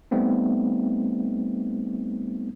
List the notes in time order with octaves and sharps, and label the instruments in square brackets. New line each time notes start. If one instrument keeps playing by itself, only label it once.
[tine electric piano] G3 A3 B3 C4 D#4